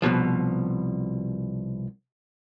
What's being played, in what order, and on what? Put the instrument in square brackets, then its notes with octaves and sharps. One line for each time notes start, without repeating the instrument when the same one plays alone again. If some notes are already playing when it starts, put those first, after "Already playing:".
[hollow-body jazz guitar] C2 G#2 B2 F3